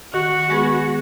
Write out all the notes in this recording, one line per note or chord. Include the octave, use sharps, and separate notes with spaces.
D#3 F#4
G#3 B3 G#4 B4